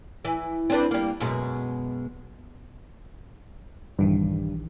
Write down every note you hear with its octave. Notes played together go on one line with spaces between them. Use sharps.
E3
C4 D4 B4
G3 A#3
F#2 B2 G#3
A#1 G2 D#3 E3